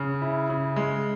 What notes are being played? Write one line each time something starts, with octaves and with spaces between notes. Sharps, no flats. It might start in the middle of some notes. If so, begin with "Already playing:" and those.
Already playing: C#3
E4
C#3
G#3